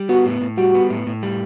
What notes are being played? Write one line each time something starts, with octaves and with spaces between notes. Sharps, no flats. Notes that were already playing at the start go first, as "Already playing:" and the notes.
Already playing: G3
B3 F#4
A2
A2
G3 F#4
B3
A2
A2
G3